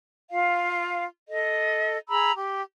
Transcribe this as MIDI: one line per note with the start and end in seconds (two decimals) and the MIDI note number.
0.31 1.04 65
0.31 1.04 77
1.28 1.96 69
1.28 1.96 75
2.08 2.32 68
2.08 2.32 82
2.08 2.32 83
2.08 2.32 88
2.34 2.59 67